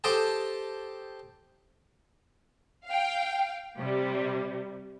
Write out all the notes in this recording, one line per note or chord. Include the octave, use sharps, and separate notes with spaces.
G4 A4 C5 D#5 G5 A5
F5 G5
C3 G3